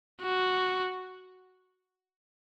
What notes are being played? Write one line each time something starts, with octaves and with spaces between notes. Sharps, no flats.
F#4